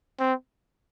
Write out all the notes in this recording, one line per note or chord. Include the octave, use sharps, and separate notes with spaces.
C4